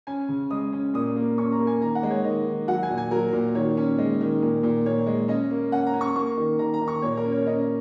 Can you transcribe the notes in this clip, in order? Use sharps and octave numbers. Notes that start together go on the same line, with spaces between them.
C#4 G#5
C#3
G#3 D#6
C#4
A#2 D#6
A#3
C#4 C#6
A#5
A#3
G#5
D#3 A#5
F#5
G#3
C#5
D#3 D#5
D#3
F#3 F#5
G#5
A#2
G#5
F#3 A#4
A#2
D#3 C#5
C#4
G#3
D#3
A#2
A#2
A#2 C#5
G#3
C#4 D#5
A#3
C#4 F#5
A#5
C#4
C#6
A#3 C#6
D#3
D#3 A#5
A#5
D#3
C#6
A#2 C#5
A#4
C#4
C#5
C#5
C#4 D#5